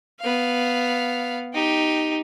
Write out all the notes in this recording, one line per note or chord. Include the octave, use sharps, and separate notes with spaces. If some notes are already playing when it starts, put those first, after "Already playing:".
B3 F5
D#4 G4